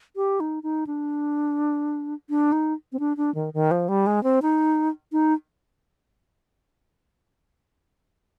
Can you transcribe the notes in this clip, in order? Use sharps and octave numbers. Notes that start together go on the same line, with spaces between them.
G4
D#4
D#4
D4
D4
D#4
C4
D4
D4
D#3
D#3
F3
G3
G#3
C4
D#4
D#4